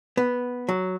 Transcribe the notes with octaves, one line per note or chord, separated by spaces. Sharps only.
B3
F#3